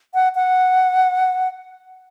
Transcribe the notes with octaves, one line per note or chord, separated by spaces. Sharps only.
F#5
F#5